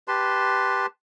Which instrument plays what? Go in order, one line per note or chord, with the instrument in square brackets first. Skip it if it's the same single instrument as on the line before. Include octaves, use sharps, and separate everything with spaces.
[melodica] G4 B4 A5 C6